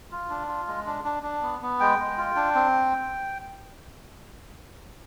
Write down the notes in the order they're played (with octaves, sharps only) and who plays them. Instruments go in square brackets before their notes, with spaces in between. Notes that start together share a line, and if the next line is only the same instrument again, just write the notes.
[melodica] F4
D4
F4
G#3
D4
D4
D4
B3
B3
G#3 G5
G#3
F4
D4
C4